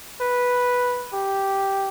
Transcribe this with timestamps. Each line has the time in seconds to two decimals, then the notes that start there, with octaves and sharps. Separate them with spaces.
0.21 B4
1.13 G4